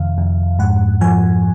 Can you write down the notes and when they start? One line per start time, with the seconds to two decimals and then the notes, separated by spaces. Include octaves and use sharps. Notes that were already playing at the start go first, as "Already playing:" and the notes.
Already playing: F2 C3 D#3 E5 F5
0.18 F2
0.59 G#2 F#5
1.01 F3 G#5